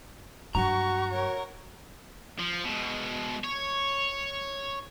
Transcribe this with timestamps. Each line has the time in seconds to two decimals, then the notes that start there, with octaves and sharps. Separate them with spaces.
0.55 G2 F#3 F#4 A#5 C#6
1.10 A#4 C#5
2.40 F3
2.64 B2 G#3
3.44 C#5